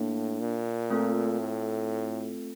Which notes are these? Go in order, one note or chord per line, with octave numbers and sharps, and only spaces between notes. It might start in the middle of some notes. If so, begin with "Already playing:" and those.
Already playing: A2 A#3 D4
A#2
A3 C4 F4 A4
A2